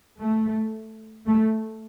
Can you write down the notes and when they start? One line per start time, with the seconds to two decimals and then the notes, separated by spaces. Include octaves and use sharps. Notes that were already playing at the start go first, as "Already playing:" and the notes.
0.19 A3
1.26 A3